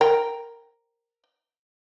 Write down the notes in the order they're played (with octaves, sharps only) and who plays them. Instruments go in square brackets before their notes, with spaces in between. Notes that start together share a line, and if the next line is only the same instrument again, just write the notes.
[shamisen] A#4 G5